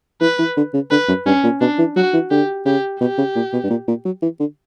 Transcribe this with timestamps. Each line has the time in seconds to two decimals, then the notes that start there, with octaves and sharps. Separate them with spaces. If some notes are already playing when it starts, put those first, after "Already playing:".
0.21 E3 B4
0.39 E3
0.57 D3
0.74 C#3
0.91 D3 B4
1.08 F#2
1.26 G2 C#4
1.44 A#2
1.61 B2 D4
1.79 E3
1.96 F#3 F#4
2.13 E3
2.31 D3 G4
2.66 C#3 G4
3.00 B2 G4
3.18 C#3
3.36 A#2
3.53 B2
3.64 G2
3.70 A#2
3.88 A#2
4.05 F#3
4.22 E3
4.40 D3